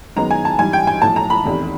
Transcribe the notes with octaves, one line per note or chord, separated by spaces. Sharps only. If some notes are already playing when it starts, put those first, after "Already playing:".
F#2 D#3 G#3 B3 A#5
G#5
A5
G#2 E3 G3 G#5
G5
G#5
B1 A2 F3 A5
A#5
B5
F1 E2 C3 D#3